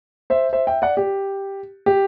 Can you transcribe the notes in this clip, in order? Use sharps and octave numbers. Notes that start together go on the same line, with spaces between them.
C5 E5
C5 E5
E5 G5
D5 F#5
G4
G4